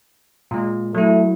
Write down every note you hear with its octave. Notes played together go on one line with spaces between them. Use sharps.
A#2 G#3
F#3 A3 E4